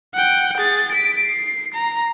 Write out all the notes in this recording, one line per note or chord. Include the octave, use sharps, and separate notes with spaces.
F#5 G5
G#4 A6
B6 D7
C7
A#5